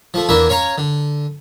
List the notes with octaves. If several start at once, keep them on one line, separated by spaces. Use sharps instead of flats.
F3 A3
E2 A#3 D4 E4 E5
C#4 C#5 F5 A#5
D3